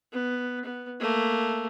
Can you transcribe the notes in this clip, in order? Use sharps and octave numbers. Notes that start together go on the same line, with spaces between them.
B3
B3
A3 A#3